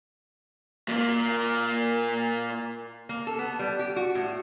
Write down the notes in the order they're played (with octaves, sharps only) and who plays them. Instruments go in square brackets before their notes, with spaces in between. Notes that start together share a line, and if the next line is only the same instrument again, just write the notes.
[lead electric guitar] A#2 A#3
[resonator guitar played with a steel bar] A#3
A4
B3
G3
G4
F#4
A2